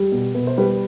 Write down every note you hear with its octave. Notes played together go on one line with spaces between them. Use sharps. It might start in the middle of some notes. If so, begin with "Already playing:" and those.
Already playing: G3 G4
B2
B2 B4
C5
G3 B4